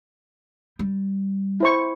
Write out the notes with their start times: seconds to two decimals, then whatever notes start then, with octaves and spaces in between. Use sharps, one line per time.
0.79 G3
1.60 E4 C5 C#6